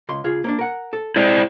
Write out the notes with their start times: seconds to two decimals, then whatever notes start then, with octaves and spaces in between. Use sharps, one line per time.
0.09 C#2 C6
0.24 C#3 F4 G#4
0.44 A#3 C#4 D4
0.59 A#4 F#5
0.93 A4
1.16 G#3 E4 C5 D5